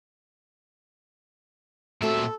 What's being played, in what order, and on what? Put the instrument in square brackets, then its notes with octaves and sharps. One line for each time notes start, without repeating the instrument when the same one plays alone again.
[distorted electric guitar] A#2 E5 [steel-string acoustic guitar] A3 C4 F#4 [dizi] A4